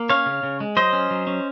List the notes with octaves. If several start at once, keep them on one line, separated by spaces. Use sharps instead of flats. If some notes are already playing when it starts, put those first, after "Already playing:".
Already playing: A#3
C#4 C#5 F5
C#3
C#3
G#3
F#3 C5 D#5
C#4
F#3
C#4